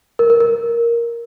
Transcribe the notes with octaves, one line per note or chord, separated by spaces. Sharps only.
A#4
A#4
A#4